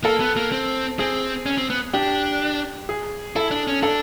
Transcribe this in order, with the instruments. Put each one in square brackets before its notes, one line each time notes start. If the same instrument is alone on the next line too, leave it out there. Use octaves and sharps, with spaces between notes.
[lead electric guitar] A#3 [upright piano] A4
[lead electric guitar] B3
A#3
C4
[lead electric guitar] C4 [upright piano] G#4
[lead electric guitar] C#4
C4
B3
[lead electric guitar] D4 [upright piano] G4
[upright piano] G#4
[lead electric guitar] E4 [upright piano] A4
[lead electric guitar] D4
C#4
[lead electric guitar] D4 [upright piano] A4